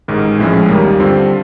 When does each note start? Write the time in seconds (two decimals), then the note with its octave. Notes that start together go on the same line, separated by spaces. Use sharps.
0.08 A1 G#2 D#3
0.39 A#1 A2 F3 G#3 C#4
0.68 D#2 D#3 G3 A#3
0.99 G2 D3 G3 C4 F4